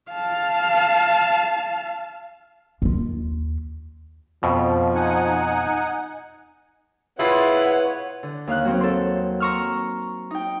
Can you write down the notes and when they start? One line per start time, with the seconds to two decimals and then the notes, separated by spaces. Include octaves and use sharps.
0.11 F5 A5
2.82 D#2 F4
4.43 F2 B2 F3
4.95 D#4 F#5 G#5
7.19 A#2 E4 F4 G#4 B4 C#5 F#5
8.23 D3
8.47 D#2 F5 F#6
8.65 F#3 C4
8.81 A4 C6
9.40 A#5 C6 C#6 E6 F6
10.31 D#4 G5